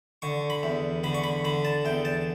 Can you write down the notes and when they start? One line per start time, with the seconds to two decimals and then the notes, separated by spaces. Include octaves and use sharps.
0.22 D3 C#6
0.50 B5
0.63 E2
1.04 D3 B5
1.15 C#6
1.24 B5
1.44 D3 B5
1.65 A5
1.85 E2 G5
2.05 A5